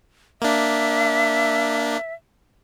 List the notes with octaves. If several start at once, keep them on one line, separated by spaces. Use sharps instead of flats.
A#3 D4 E5